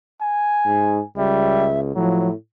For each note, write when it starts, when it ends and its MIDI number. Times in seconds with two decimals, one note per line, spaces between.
0.22 1.06 80
0.66 0.99 44
1.18 1.92 37
1.18 1.69 55
1.18 1.80 76
1.96 2.33 45
1.96 2.29 53
1.96 2.30 54